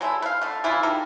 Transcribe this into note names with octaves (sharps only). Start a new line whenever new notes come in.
F#3 G#3 A3 E4
B4 F5
D3 A3
C#3 E3 E4 F4
D#4 G4 A4 A#4